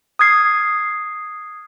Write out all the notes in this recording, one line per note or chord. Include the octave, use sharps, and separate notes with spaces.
D#6 F6 G#6 C7